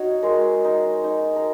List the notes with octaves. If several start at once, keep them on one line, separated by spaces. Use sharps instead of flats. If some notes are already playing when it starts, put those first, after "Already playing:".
Already playing: D#4 F#4 C#5
G#3 A#4
D#4
D#4
A#4